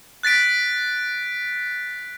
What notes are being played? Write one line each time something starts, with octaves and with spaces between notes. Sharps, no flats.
F#6 A6 B6 D7